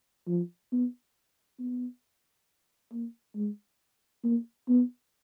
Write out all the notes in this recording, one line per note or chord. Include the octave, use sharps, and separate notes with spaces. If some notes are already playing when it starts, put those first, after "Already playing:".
F3
B3
B3
A#3
G#3
A#3
B3